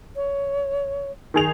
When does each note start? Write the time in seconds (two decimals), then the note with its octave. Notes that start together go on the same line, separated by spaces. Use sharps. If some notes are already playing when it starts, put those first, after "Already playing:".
0.16 C#5
1.34 D#3 G#4 F7